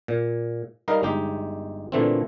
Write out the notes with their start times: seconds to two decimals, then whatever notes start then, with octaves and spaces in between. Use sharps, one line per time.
0.08 A#2
0.88 G3 D#4 A#4 D#5 F5
1.03 G1 G#3 D#4 G4
1.92 A#2 D3 E3 A3 A#3 C4